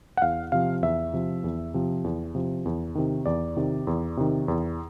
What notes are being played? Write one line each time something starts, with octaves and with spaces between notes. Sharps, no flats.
F#5
E2 F5
C3 F3 F5
E2 E5
C3 F3
E2
C3 F3
E2
C3 F3
E2
C3 D#3
E2 D5
C3 D#3
E2
C3 D#3
E2